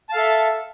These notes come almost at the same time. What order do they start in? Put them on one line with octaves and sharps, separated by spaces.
A5 F5 A4 E5